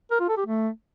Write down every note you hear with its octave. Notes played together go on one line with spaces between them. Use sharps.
A#4
F4
A4
G4
A3